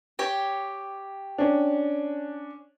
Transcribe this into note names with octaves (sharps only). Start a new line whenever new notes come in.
G4 C#5 G5
C#4 D4